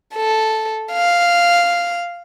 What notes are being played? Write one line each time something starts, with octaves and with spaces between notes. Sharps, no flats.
A4
F5